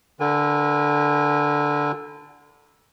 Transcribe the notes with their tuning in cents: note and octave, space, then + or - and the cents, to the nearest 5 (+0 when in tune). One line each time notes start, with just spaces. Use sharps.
D3 +0 A#4 +45 G#5 -20